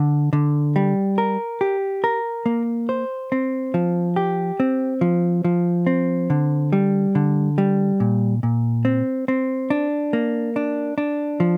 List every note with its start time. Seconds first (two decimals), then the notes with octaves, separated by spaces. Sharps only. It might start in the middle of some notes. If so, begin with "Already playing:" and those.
Already playing: D3
0.33 D3
0.76 G3
1.18 A#4
1.61 G4
2.04 A#4
2.46 A#3
2.89 C5
3.32 C4
3.74 F3
4.16 G4
4.60 C4
5.01 F3
5.44 F3
5.87 C4
6.30 D3
6.73 G3
7.15 D3
7.58 G3
8.00 A#2
8.43 A#2
8.85 C4
9.28 C4
9.70 D4
10.13 A#3
10.56 D4
10.98 D4
11.40 F3